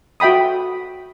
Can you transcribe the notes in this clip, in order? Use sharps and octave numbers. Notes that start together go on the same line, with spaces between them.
F#4 E5 G5 B5 D#6